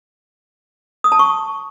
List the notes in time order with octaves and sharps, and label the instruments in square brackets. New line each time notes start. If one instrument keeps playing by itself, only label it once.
[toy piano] D#6
A5
C#6